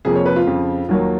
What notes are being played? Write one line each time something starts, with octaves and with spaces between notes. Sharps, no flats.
F1 F2 F3 A#3 G#4
C#5
B4
F4
F2 C#3 F3
D#2 D#3 F#3 A#3